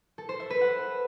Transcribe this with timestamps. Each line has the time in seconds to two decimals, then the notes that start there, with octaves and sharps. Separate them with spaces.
0.18 A4
0.29 C5
0.40 E5
0.50 B4
0.61 F#5